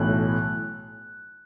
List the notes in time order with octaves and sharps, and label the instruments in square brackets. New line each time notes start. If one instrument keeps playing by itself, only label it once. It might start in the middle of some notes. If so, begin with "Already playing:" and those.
Already playing: [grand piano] B1 A2 E3 F#6